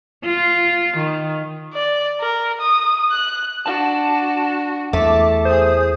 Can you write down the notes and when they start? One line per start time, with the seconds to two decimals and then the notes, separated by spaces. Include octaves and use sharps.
0.25 F4
0.97 D#3
1.74 D5
2.21 A#4
2.60 D#6
3.11 F#6
3.66 D4 F#4 A5
4.93 E2 A3 A5 D6
5.45 G#4 C5 D#6